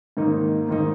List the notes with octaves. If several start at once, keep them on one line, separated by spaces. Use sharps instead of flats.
G#2 D#3 A#3 D#4
G#2 D#3 A#3 D#4